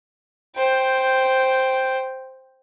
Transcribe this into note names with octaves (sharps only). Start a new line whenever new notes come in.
C5 G5